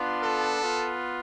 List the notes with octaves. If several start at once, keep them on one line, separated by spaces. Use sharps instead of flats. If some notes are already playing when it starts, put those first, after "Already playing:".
Already playing: B3 D4 F4
A4
B3 F4